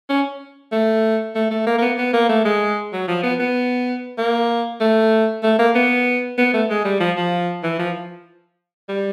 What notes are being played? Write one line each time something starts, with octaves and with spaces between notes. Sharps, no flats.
C#4
A3
A3
A3
A#3
A#3
B3
B3
A#3
A3
G#3
F#3
F3
B3
B3
A#3
A3
A3
A#3
B3
B3
A3
G#3
G3
F3
F3
E3
F3
G3